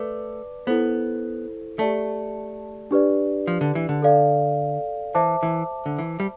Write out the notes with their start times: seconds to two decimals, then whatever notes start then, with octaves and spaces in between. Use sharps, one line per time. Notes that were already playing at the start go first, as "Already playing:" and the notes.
Already playing: A3 B4 D5 A5 D6
0.67 B3 E4 A4 C5
1.79 A3 G4 D5 A5
2.91 D4 G4 B4 D5
3.47 F3
3.61 D3
3.75 E3
3.89 D3
4.02 A4 D5 F5
5.15 E3 C5 E5 A5 D6
5.43 E3
5.86 D3
5.98 E3
6.20 G3